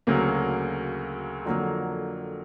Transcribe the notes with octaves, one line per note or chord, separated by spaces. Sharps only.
D2 C#3 F#3 A#3
F2 D3 F#3 A#3